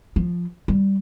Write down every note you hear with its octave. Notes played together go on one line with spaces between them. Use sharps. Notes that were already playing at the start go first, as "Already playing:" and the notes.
F3
G3